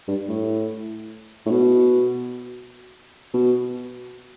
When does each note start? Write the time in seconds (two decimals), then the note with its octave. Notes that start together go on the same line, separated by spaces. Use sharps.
0.08 G2
0.29 A2
1.46 A2
1.51 B2
3.34 B2